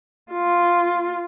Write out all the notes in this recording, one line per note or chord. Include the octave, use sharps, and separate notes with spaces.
F4